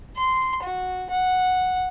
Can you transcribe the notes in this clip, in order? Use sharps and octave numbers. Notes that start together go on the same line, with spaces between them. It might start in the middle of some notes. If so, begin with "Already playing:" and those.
C6
F#4
F#5